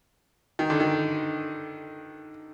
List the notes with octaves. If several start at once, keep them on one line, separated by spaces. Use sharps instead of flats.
D#3
D3
D#3